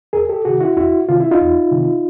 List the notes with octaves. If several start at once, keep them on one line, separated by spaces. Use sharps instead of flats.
E2 G#4 A#4
G4 A4
C3 D#3 F#4 G#4
E4 F#4
E2 E4 F#4
C3 D#3 F4
E4
D#4 F4
E2
C3 D#3